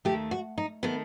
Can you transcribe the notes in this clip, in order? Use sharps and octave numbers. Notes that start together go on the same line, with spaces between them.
D#2 D#3 A3 G4
F#4
D#4
D#3 A3 B3